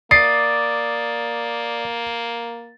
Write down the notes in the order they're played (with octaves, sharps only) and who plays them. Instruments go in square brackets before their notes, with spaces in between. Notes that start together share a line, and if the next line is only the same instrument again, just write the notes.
[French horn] A#3 [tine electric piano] D5 D6 D#6 [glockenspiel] A6 [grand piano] C7